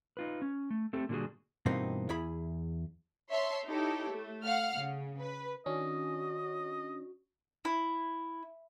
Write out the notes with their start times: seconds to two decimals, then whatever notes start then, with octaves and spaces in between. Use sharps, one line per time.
0.17 D#4 F4 B4
0.42 C#4
0.71 A3
0.93 A3 C4 G4 A4
1.09 A#2 D3 G3 G#3 F#4 G#4
1.66 G2 B2 E3 A#3 C4 D#4
2.09 E2 E4 G#4 B5
3.29 C#5 E5 A5 C6
3.67 D#4 E4 G4 A4 C#5
4.11 A3
4.45 F5 F#5 F6
4.75 C#3
5.19 B4
5.66 D#3 C#4 D4 F#4 D#5
7.65 E4